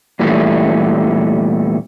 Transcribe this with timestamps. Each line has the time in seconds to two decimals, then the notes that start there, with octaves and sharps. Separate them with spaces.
0.19 E2 A#2 E3 G3 A3